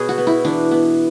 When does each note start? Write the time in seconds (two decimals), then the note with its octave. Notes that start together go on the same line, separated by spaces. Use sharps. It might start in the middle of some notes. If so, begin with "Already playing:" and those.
Already playing: B2 G#4 B4 C#5
0.09 F#4
0.18 B3
0.27 E4
0.45 E3 D4
0.71 B3